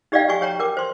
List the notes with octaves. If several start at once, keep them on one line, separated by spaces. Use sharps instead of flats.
D#4 G4 D5 D#5 F5 G5
F#4 G4 G#5 C#6
G4 C#5 G5 A#5
A#4 G5 D6
C5 C6